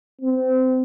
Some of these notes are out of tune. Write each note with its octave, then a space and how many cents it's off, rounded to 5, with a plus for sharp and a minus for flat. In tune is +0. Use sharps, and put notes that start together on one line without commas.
C4 -25